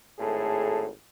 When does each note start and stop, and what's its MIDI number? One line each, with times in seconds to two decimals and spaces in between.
0.19 0.86 32
0.19 0.86 45
0.19 0.86 68
0.19 0.86 69